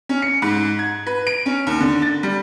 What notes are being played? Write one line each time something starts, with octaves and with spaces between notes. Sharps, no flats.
C#4
C#7
G#2
G#6
B4
D7
C#4
D#2
D3
A6
G3